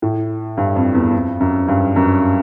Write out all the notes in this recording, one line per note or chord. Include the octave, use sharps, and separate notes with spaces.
A2
G2
F2
E2
F2
F#2
G2
F#2